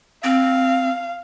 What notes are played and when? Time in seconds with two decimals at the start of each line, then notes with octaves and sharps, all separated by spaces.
0.24 C4 F5